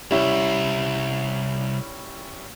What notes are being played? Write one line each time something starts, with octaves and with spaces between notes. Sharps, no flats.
C2 G3 C#4 E4